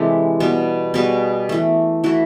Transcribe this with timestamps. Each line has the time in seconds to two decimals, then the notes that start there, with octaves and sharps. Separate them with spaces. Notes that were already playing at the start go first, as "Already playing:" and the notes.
Already playing: C3 E3 G#3 G4 A4
0.40 B2 G3 B3
0.94 B2 G3 B3 F#4 G#4
1.49 E3 A3
2.04 E3 A3 E4 F#4